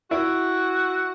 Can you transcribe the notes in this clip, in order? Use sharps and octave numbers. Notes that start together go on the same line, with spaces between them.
E4 F#4